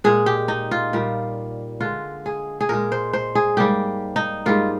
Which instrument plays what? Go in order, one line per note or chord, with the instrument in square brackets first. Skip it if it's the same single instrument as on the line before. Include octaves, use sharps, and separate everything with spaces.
[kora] A#2 G#3 G#4
G4
D#4
F4
A#2 G3 A#3
D3 G#3 F4
G#4
G#4
A#2 G#3 A#4
C5
C5
G#4
G#2 G3 A#3 G4
D#4
G#2 G3 A#3 F4